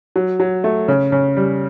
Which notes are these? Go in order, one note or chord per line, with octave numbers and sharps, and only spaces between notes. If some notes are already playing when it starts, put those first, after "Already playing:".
F#3
F#3
A3
C#3
C#3
G3